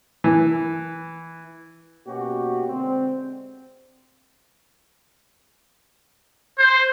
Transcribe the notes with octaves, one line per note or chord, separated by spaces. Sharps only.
E3
B2 A#3 C#4 F#4 G4
D3 G#3 C4
C5